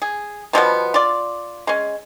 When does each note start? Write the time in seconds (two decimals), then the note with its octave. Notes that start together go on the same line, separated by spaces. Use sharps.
0.02 G#4
0.53 B2 F3 G3 B3
0.94 F4 D5
1.67 G#3 C#4